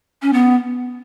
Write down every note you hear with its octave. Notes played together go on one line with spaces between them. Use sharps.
C#4
B3